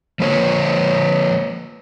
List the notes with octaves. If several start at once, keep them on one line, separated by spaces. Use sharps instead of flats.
F3 A#3 B4 C#5